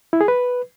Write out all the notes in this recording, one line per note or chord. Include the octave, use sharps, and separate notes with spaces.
E4
G#4
B4